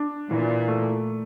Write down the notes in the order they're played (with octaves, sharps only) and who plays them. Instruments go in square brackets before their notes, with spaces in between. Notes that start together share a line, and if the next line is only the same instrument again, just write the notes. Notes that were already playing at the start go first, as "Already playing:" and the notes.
Already playing: [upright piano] D4
[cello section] A#2 [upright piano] E3
[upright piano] A3